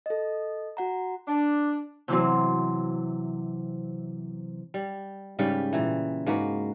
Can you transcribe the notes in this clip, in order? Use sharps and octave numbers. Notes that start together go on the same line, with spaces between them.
A4 D#5
F#4 F#5 A#5
D4
C3 E3 F#3 C4
G3
G#2 C#3 G3 B4
A#2 E3
G#2 A#3 F#4 B4